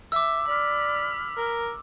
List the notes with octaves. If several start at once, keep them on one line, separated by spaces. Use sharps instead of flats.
E5 D6 E6
D5 B5 F6
A#4